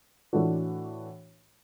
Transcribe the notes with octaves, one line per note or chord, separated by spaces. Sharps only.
A2 E3 A3 D4 F#4